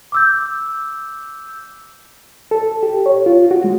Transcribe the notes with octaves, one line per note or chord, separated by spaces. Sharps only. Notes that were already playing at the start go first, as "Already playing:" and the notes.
D6 E6 G6
A4
G4
C#5
F4
F#4
G#3